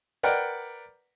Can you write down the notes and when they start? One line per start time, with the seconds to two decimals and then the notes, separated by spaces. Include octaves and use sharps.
0.23 A#4 B4 D5 F#5 G5